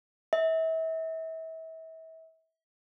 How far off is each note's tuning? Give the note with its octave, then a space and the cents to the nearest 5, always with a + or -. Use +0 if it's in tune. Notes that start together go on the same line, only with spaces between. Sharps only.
E5 -35